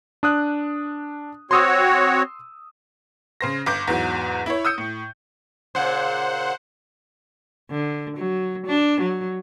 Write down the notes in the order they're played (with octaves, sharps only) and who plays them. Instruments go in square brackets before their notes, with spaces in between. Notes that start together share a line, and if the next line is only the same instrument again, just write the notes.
[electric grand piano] D4 D#6 F#6
[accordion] C4 F#4 C#5 [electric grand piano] C6 D#6 E6
[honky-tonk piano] C#3 C5 A#6
G1 D6 G6
E2 G#2 F#3
E4 C#5
D#6 E6 G6 C#7
A2
[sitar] A#2 C#3 [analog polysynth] C5 F#5
[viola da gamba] D3
F#3
D4
F#3